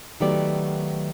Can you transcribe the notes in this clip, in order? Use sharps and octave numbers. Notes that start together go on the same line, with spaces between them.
D#3 F#3 A3 B3 G4 D5